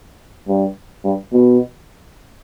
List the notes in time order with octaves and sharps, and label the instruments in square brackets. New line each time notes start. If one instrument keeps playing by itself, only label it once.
[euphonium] G2
G2
B2